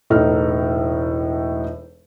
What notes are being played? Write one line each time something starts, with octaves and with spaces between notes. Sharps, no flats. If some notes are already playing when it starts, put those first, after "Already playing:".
E1 A2 D#4 A4 F6